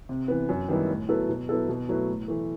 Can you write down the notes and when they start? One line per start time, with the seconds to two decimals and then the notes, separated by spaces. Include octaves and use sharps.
0.09 C3
0.28 E3 B3
0.49 F#2
0.68 D#3 G3 B3 E4
0.89 A2
1.09 F#3 B3 E4 A4
1.29 B2
1.49 F#3 B3 E4 A4
1.69 B2
1.89 F#3 A3 E4 B4
2.09 A2
2.28 E3 A3